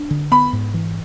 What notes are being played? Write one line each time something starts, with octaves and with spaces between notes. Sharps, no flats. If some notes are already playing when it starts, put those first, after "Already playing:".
Already playing: D4
D3
B3 B5
G#2
E3